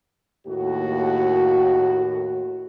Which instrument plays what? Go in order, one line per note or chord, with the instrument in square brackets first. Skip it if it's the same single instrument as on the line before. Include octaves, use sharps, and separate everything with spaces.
[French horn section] D#2 A2 F#4